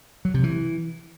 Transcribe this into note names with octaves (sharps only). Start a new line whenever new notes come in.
F#3
C3
E3